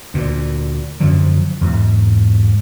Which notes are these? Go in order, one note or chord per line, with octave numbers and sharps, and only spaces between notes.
D2 A#2
F#2 D3 F3 F#3
E2 G#2